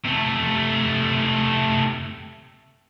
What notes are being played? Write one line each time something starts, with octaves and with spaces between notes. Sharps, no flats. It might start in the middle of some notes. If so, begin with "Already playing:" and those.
C3 A3